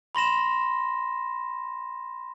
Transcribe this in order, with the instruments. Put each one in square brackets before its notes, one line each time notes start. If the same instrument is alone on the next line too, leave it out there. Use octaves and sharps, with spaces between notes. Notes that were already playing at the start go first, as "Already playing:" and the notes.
[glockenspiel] B5 C6 A#6 E7